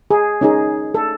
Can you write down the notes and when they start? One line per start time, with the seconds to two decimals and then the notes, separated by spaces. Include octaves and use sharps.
0.11 G#4
0.41 C#4 D#4 G#4
0.94 A4